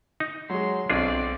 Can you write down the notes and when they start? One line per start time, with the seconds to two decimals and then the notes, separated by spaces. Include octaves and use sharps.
0.20 D#4
0.50 F#3 G#3 C6
0.90 B1 C4 D4 F4 G#4 D5